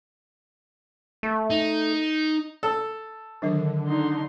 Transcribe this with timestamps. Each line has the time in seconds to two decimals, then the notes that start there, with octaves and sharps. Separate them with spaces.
1.23 A3
1.50 D#4
2.63 A4
3.42 D3 D#3 F#3 A#4
3.88 D#4 C6